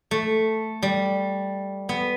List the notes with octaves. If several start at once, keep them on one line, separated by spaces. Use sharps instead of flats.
A3
G3
B3